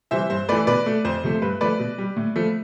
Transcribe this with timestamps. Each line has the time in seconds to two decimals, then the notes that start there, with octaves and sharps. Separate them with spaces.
0.11 C3 E3 G3 C5 E5
0.30 G2 C5
0.49 E3 A3 B4 D5
0.67 B2 B4 D5
0.86 A3
1.05 F2 C5
1.23 C3 F3 A3
1.42 G2 B4
1.61 F3 A3 B4 D5
1.80 B2
1.98 G3
2.17 A2
2.36 F3 A3